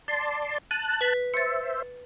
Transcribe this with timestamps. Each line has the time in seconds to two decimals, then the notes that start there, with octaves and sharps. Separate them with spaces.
0.08 D5 A5 C6
0.71 A5 F#6 D#7
1.01 B4 B6
1.34 C5 E5 A6 C#7